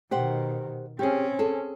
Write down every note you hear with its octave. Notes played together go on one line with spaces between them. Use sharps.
B2 D#3 G4 C5 F#5
C4 C#4 G4 G#4
G#4 A4